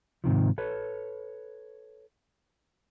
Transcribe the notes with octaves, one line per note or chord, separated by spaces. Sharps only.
G#2 C3 D#3 F3
A4 B4 C#5